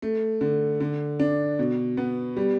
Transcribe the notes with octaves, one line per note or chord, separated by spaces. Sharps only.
A3
D3
D3
D4
B2
B3
G3